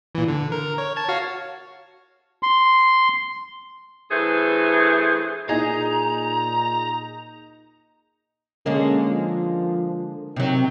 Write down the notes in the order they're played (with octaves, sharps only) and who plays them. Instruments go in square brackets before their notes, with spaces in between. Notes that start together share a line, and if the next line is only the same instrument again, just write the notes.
[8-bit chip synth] A#2 E3
D3
A#4
C#5
A5 G#6
F#4 C#5 F5
[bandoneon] C6
[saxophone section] G2 E3 A3 G#4 C5
[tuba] A#2 [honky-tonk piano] D#4 D#5 [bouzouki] G#4 [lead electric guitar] A#5
[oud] D3 G#3 A#3 [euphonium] C#4
[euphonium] F3
[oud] C3 F#3 [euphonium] D#3